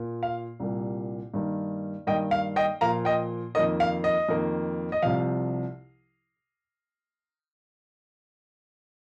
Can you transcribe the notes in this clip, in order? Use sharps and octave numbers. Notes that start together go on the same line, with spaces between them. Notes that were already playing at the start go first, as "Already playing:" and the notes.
Already playing: A#2 A#3
F5
C2 A#2 G3 A#3
G2 D#3 A#3
G2 D#3 A#3 D#5 G5
F5
D#5 G5
A#2 F3 A#3 F5 A#5
D#5 G5
F2 D#3 A#3 D#5
F5
D#5
F2 D#3 A#3
D#5
C2 C3 F3 F5